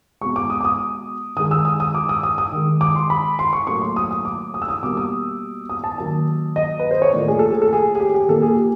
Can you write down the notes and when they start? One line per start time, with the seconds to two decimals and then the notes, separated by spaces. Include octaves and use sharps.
0.21 B2 G#3 C#6
0.36 D6
0.50 D#6
0.61 D6
0.65 D#6
1.37 D#3 G#3 D#6
1.51 E6
1.65 D#6
1.80 D#6
1.95 D6
2.09 D#6
2.23 D#6
2.38 D#6
2.52 D#3 G#3
2.81 D6
2.95 C6
3.10 B5
3.39 C6
3.53 C#6
3.67 A2 F#3 A#3 C#6
3.82 C6
3.96 D#6
4.11 D#6
4.25 D6
4.54 D#6
4.62 E6
4.69 D#6
4.83 B2 G3 A#3 D6
4.97 D#6
5.69 D#6
5.84 A5
5.98 D#3 F#3 A#3 A5
6.56 D#5
6.79 B4
6.91 C5
7.02 C#5
7.13 A2 F3 A#3 D5
7.28 G#4
7.39 A4
7.51 G#4
7.62 A4
7.73 G#4
7.95 G#4
8.00 G4
8.14 G4
8.29 A#2 F3 A#3 A4
8.42 G#4
8.54 G4